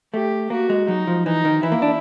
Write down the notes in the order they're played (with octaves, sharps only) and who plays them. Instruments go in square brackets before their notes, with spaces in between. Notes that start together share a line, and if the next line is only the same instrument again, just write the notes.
[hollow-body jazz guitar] A3 [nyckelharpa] G4
[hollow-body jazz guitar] A#3 [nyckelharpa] F#4
[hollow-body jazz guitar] G#3
[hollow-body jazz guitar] F#3 [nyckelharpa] D#4
[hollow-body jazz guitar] F3
[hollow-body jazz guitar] E3 [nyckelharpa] D#4
[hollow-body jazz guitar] D#3
[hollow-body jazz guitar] E3 [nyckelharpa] E4
[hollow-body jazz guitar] A#3
D4